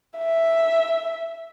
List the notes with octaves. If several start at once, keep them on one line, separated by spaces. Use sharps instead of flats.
E5